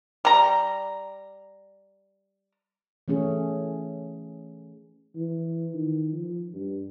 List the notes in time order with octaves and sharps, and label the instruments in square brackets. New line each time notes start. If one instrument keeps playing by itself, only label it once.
[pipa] G3 A#5
[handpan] E3 A3 C#4 G#4
[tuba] E3
D#3
F3
G2